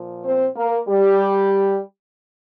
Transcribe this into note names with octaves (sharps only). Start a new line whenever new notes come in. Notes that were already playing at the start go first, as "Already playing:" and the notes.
Already playing: A#2 F3
C4 C5
A#3 A#4
G3 G4